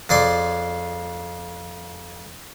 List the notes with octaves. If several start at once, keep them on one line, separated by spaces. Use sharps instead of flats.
F2 G#4 D5 C6